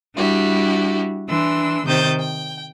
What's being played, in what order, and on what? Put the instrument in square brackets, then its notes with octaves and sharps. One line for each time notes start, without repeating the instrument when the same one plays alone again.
[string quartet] G3 D4 E4 F#4 G4
E3 D4 C6 E6
C3 D#3 C5 D#6 G6 A6
G5